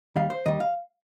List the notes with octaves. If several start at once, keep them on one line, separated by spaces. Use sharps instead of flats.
D#2 D#3 G3 F5
C5
D#2 D#3 G3 D#5
F5